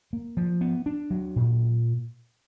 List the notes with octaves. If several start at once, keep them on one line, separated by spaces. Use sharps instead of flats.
A#3
F3
B3
D4
F#3
A#2